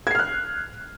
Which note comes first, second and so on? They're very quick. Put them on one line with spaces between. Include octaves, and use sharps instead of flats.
G#6 C7 F6 F#6